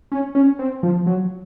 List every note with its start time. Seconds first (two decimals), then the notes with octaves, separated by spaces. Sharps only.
0.12 C#4
0.35 C#4
0.59 C4
0.83 F3
1.07 F#3